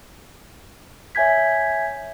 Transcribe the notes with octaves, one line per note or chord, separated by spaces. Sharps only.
C#5 E5 G#5 G6 G#6 B6